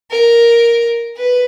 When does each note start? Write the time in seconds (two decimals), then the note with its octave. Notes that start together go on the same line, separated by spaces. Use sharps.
0.11 A#4
1.17 B4